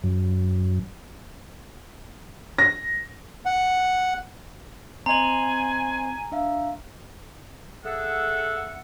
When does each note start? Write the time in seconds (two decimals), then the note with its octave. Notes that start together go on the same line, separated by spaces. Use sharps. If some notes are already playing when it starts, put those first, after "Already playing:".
0.04 F#2
2.58 A#6
3.46 F#5
5.06 C4 D#5 G#5 A#5 C6 F#7
6.32 D4 E5 F5
7.83 G#4 A4 E5 F#5